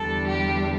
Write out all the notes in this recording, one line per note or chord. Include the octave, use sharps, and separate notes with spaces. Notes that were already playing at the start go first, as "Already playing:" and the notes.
Already playing: E2 D3 G3 D4 A4
G4